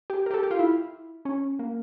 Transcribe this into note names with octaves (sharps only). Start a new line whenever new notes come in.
G4
A#4
G4
A4
G4
F4
E4
C#4
A#3